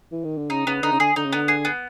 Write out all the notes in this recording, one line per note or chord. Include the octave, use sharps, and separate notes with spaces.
E3
D#3
D3
C#3 D#4
C#3 B3
D3 D#4
C#3
D3 G#4
D3 D#4
C#3
D3 B3
G#4
B3